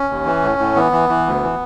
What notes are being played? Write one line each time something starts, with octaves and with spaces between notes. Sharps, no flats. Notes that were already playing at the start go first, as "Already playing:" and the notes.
Already playing: C#4
D#2
E3
A2
A2
E3 B3
E3
E3
D2
E3